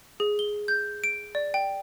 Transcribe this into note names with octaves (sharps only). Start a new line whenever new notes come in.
G#4
G7
G6
D7
D5
G5